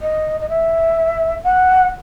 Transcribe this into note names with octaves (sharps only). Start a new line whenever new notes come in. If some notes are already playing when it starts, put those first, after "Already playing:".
D#5
D#5
E5
F#5